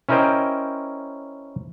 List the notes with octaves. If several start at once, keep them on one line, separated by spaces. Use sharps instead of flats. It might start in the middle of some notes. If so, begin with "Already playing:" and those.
C#4 E4 A#4 C5 D#5 G5